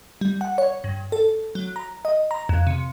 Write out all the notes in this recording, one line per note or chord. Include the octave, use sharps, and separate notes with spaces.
G3
F#5
C#5
G2
A4
F#3
A#5
D#5
A#5
F2
C3